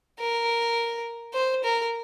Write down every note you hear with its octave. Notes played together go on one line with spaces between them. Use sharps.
A#4
C5
A#4